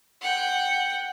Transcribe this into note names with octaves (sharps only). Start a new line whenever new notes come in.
F#5 G5